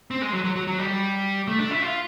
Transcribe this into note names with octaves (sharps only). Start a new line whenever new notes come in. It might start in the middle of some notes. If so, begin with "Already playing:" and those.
C4
G#3
F#3
F#3
F#3
F#3
G3
A3
D4
E4
F4